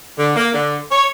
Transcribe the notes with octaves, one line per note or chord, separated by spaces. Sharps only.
D3
A#3
D3
C#5